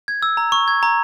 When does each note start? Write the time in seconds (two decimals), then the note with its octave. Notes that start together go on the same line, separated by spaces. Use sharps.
0.08 G#6
0.23 E6
0.37 A#5
0.52 C#6
0.68 G#6
0.83 A#5